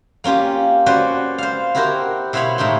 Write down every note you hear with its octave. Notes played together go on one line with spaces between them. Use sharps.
A#3 C#4 F4 G4
C#4 F#4 B4 C5 D5
C5 F5
E4 F#4 G4 A#4 C5
B2 E4 C5 C#5 F5 B5
A2 D#4 E4 G4 C6